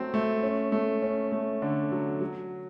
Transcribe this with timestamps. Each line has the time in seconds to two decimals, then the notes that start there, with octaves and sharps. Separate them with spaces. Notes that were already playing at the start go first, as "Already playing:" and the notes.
Already playing: F#3 A3 C4
0.14 A3
0.43 C#4
0.72 A3
1.02 C#4
1.32 A3
1.62 D3
1.92 F#3
2.21 F#3